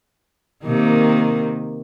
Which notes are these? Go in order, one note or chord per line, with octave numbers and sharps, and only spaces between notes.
C3 D#3 A#3